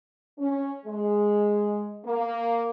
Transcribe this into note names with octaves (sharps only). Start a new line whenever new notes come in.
C#4
G#3
A#3